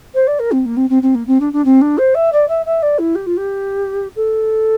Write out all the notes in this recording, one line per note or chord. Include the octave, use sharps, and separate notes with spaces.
C5
D5
A#4
C4
A#3
C4
C4
C4
A#3
C4
D4
D4
C4
D4
C5
E5
D5
E5
E5
D5
E4
G4
F4
G4
A4